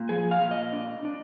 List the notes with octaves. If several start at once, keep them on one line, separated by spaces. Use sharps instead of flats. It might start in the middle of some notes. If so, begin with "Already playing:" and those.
Already playing: A#2
F3 G#4
F5
A#2
D#5
D4
D4